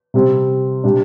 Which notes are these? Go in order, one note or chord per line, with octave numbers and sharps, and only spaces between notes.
C3 G3 C4
C3 G3 D4